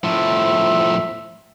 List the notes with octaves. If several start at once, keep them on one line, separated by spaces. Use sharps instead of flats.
A2 F3 E5